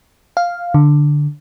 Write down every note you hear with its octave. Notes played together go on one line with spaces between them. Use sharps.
F5
D3